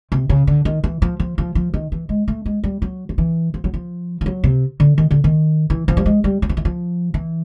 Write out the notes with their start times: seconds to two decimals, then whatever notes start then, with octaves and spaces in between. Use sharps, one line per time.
0.12 C3
0.29 C#3
0.47 D3
0.65 D#3
0.84 E3
1.02 F3
1.20 F3
1.38 F3
1.55 F3
1.74 D#3
1.92 E3
2.09 G#3
2.28 A3
2.46 G#3
2.64 G3
2.82 F#3
3.09 F3
3.18 E3
3.54 F3
3.64 F#3
3.74 F3
4.21 F3
4.26 F#3
4.44 C3
4.80 D3
4.98 D#3
5.11 D3
5.24 D#3
5.70 E3
5.88 F3
5.97 G3
6.06 G#3
6.24 G3
6.42 F#3
6.49 F3
6.57 E3
6.65 F3
7.14 E3